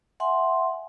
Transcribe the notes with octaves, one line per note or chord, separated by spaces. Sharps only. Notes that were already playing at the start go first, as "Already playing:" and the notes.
E5 F#5 G#5 C6